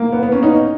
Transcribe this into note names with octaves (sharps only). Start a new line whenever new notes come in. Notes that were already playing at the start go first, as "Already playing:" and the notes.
Already playing: A#3
B3
B3
C#4
D#4